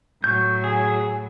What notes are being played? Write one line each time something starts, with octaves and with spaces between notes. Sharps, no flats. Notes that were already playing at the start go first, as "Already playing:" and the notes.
A2 F#3 C#6 G6
G#4